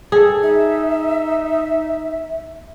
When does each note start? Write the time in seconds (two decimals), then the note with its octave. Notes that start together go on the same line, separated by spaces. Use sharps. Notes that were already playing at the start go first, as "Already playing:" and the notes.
0.12 G2 G#4 A4
0.42 D#4 E5